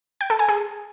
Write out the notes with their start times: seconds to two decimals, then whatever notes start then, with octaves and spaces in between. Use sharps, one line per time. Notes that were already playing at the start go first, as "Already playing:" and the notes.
0.21 G5
0.30 A4
0.39 G#5
0.49 G#4